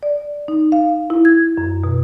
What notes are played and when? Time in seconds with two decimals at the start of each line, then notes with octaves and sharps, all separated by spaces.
0.03 D5
0.48 D#4
0.72 F5
1.10 E4
1.25 G#6
1.58 F#2
1.84 B2